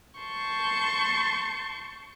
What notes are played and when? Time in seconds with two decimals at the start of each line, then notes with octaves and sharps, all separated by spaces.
0.21 A5 C6 C#6 G6